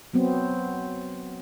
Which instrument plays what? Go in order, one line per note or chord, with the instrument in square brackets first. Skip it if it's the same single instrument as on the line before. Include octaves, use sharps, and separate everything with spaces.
[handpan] F#3 B3 C4